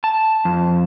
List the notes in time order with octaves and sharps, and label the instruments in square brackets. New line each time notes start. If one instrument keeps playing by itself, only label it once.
[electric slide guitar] A5
F2